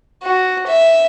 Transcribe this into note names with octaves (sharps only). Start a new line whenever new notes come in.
F#4
E5